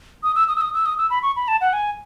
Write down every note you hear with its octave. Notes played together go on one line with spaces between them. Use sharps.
D#6
E6
D#6
E6
D#6
E6
D#6
E6
B5
C#6
B5
A5
F#5
G#5